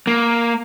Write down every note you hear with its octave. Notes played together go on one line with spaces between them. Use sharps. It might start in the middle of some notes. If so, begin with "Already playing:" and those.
A#3